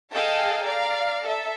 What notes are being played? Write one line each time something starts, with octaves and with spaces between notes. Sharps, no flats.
G#4 A4 D#5 F5 G5 A5
D5 F5 A#5
A4 E5